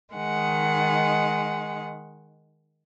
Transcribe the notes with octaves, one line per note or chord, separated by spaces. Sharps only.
D#3 G#3 F#5